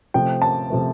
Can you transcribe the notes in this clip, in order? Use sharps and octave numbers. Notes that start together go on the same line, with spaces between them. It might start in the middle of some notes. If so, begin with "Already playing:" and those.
C3 F3 A3 G5
A5
C3 F3 A3